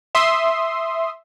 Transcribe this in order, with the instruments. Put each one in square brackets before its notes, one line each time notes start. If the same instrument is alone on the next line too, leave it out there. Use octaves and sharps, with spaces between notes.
[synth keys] E5 C6 D#6